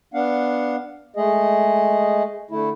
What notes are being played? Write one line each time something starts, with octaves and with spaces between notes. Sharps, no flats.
B3 D4 F5 F#5
G#3 A3 G#4 D#5
D3 A3 E4